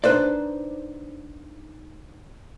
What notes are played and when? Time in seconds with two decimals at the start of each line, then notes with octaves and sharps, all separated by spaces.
0.04 D4 D#4 B4 C5 D5